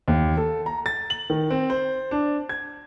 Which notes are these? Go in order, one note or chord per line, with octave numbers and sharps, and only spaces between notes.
D#2
A4
A#5
A6
F#7
D#3
C4
C5
D4
G#6